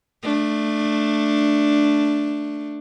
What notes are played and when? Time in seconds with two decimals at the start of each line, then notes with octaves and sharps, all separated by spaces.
0.23 A3 D4